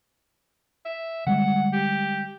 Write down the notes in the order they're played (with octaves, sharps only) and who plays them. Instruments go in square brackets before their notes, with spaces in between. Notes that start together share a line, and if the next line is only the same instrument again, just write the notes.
[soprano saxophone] E5
[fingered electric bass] D3 G3 G#3 [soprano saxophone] F#5
[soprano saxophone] G4